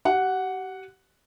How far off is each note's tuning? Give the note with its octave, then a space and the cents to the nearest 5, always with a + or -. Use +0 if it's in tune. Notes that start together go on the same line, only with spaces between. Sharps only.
G4 -35 F#5 +0